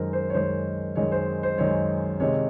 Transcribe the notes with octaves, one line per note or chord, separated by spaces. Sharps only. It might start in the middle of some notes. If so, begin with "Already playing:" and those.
Already playing: F#2 D#3 G#3 A#4 C5
C5
C#5
F#2 D#3 G#3 C5
F#2 D#3 G#3 C#5
C5
C5
F#2 D#3 G#3 C#5
C3 D#3 G#3 C#5